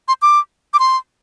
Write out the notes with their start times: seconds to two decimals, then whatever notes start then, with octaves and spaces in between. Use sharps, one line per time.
0.08 C6
0.22 D6
0.74 D6
0.79 C6